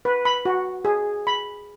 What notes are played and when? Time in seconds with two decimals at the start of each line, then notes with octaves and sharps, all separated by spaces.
0.05 B4
0.25 B5
0.45 F#4
0.85 G#4
1.27 B5